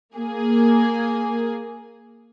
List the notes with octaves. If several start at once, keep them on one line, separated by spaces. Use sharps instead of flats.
A#3 G#4